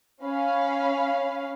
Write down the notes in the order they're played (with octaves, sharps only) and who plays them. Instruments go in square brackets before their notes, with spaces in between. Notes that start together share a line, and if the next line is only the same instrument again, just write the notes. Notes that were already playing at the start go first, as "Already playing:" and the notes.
[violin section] C#4 F5 B5